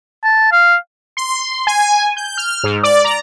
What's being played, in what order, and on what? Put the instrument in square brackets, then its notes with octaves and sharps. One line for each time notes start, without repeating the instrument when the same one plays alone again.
[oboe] A5
F5
[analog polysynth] C6
G#5
G6
F6
G#2
D5
A#5